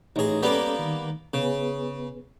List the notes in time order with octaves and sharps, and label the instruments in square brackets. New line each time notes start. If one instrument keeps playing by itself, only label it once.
[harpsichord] A1 G#4 [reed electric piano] D#4 C#5 A#5
[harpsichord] G3 A#3 B3 [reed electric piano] C#4 A4
[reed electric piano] D#3
[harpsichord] C#3 [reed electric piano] B3 G#4 B4